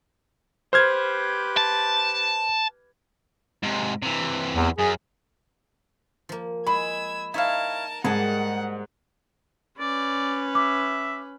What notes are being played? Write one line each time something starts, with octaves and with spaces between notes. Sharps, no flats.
G4 B4 C5 F6 G#6
A5
G#2 C3
C3 E3
E2
F#2 G#4
F3 A#3
G#3 B5 E6 G#6
D#4 E4 A#4 C#5 F5 A5
G#2 G3 A#3 G#4 D#5 F#5 A5
C#4 B4 D5
E5 D6